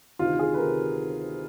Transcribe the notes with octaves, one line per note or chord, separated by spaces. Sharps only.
D2 C3 D#3 F4
G#4
B4
C3 D#3 A#4